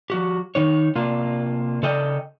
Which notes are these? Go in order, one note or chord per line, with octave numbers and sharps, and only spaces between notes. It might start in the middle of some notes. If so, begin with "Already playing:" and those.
F3 F#4 G4
D#3 D#4 C#5
C3 A#3 D4 F4
C#3 A4 D5 D#5 G5